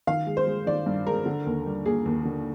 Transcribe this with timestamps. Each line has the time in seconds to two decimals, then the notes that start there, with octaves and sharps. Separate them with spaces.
0.07 D#3 F5
0.27 G#3
0.37 C5
0.47 G#3
0.67 D#3 D5
0.86 G2
1.07 G#3 A#4
1.26 D3
1.47 D#2
1.66 G3
1.86 A#3 G#4
2.06 D#2
2.25 D3